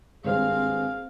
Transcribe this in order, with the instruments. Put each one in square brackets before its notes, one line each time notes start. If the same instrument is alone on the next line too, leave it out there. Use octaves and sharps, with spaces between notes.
[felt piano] G#1 G2 C5 [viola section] A#3 C4 F5 [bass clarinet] G#4